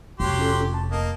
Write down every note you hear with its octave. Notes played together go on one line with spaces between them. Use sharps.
F1 F#3 G4 C6
C#4 F4 A4
A5
A#3 D#5